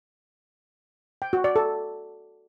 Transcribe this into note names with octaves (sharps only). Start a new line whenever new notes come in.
G5
F#4
D5
A4